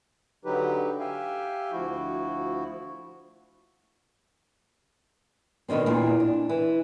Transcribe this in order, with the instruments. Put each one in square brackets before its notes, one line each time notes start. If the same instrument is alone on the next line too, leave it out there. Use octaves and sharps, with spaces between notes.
[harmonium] D3 F#3 D#4 G4 B4
G4 E5 F5 G5 G#5
D2 F3 E4 F#4
[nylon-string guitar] B2 D3 D#3 F#3 C4
E2 A#2 C4
D4
E3